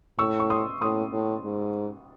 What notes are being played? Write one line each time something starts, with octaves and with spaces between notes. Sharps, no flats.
A2 C#6 E6
C#6
C6 D#6
A2 C6 D#6
A2
G#2